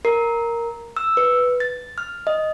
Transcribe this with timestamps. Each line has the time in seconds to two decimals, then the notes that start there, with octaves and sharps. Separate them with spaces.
0.05 A#4
0.97 E6
1.17 B4
1.60 A6
1.98 F6
2.27 D#5